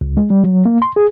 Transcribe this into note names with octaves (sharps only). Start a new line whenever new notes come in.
C#2
G#3
G3
F#3
A#3
C6
G#4